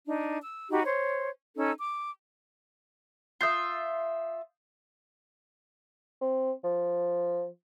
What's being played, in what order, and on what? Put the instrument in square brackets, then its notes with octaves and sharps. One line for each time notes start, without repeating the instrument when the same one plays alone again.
[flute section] D4 D#4
E6
D#4 F#4 G4 B5
C5 C#5
C#4 D#4 A4 E6
D6
[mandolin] F4 E5 [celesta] D#6 G6 C7
[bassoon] C4
F3